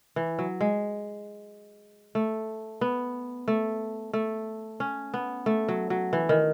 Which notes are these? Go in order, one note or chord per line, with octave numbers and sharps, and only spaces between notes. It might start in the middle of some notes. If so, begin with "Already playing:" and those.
E3
F#3
G#3
A3
B3
A3
A3
C#4
B3
A3
F#3
F#3
E3
D#3